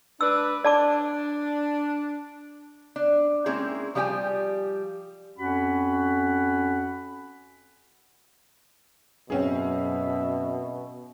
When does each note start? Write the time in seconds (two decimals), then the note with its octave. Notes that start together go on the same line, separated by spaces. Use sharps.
0.21 D4 B4 E6
0.64 D4 D5 A5 D6
2.96 D4
3.46 G#3 A#3 C4 C#4 E4 G#4
3.95 F3 G3 G4 G5 G#5
5.38 F2 C#4 F#4 F#5 B5
9.30 F#2 B2 C4 C#4 G#4 E5